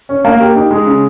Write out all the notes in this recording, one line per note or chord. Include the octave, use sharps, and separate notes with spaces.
C#4
A#3
G4
D#4
G#3
C#3